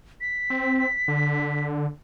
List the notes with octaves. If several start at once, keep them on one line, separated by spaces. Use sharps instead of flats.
B6
C4
D3